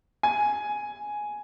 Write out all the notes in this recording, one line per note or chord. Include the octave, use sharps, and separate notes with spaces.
G#5